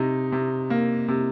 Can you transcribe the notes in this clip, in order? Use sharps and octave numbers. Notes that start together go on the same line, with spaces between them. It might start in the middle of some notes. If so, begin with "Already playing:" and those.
Already playing: C3 D#4
C3
A#3
C3